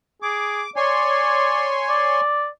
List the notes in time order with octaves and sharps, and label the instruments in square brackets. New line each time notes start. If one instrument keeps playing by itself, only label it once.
[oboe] G#4 [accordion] D6
[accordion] C#5 G#5 C6 [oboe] D5
[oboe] D5